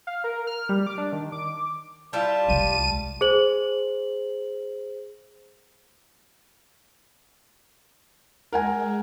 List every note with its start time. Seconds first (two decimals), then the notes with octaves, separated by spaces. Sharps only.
0.07 F5
0.24 A#4
0.47 F6
0.69 G3
0.86 D6
0.98 D4
1.13 D#3
1.32 D6
2.13 G3 E4 F4 A5
2.49 C2 G#3 D#7
3.21 G#4 C5 F#7
8.52 G#3 A#4 F#5 G#5